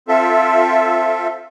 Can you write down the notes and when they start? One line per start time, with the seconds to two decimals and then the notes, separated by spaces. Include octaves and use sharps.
0.08 C4 F4 A4 E5